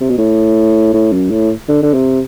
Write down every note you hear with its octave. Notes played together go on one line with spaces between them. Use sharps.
C3
B2
A2
A2
F#2
A2
D3
D3
C3